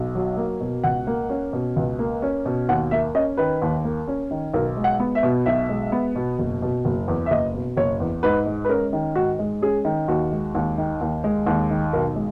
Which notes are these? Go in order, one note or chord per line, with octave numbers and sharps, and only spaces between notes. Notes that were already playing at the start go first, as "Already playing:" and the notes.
Already playing: B1
F#3
A#3
B2
C#2 F#5
A#3
C#4
B2
C#2
A#3
C#4
B2
D#2 F#5
A#3 E5
C#4 D#5
D#3 B4
D#2
A#3
C#4
D#3
B1 A#4
G#3
F#5
B3
E5
B2
B1 E5
G#3
B3
B2
F#1
B2
F#1
E2
E5
F#1 D#5
B2
F#1 C#5
E2
G#2 B4
G#3
B4
C#4 A#4
D#3
G#2 F#4
G#3
C#4 G#4
D#3
D#2 F#4
G#3
D#2
D#3
D#2
G#3
D#2
D#3
B1 A#4
G#3